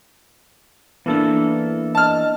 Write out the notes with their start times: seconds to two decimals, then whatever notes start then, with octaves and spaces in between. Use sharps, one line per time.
1.06 E3 A#3 B3 D4 A4
1.95 D#5 A5 F6